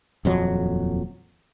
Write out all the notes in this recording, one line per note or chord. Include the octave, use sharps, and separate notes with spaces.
D#1 F2 F#3